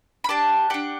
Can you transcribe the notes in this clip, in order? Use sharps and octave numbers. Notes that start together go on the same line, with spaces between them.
B5
D4 G4 A5
D4 G4 F#5